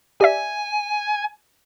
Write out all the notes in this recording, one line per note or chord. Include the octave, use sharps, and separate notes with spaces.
G4 D5 E5 G#5